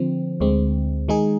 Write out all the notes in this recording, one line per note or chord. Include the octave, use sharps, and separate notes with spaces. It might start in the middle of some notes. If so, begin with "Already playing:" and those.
Already playing: D3 F3 C4
D2 D3 G#3 C4
D#3 G#3 D#4 G#4